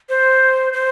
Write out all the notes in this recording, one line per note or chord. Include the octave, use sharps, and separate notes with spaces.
C5
C5